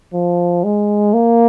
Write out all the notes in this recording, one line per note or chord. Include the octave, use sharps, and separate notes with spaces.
F3
G#3
A#3